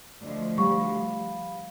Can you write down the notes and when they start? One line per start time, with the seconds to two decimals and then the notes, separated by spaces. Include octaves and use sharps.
0.22 D2 F3 D5 D#5
0.58 G3 F5 F#5 B5 C#6